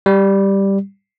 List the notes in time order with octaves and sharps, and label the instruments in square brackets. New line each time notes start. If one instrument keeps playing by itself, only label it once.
[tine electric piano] G3